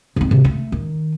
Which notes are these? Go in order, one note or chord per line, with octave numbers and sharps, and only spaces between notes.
G#2 C4
C3
A3
D#3